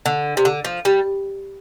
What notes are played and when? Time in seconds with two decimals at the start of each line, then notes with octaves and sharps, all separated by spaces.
0.06 D3
0.37 C3
0.45 D3
0.65 F3
0.85 G3